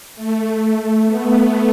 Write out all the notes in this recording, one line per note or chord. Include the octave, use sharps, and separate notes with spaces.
A3
B3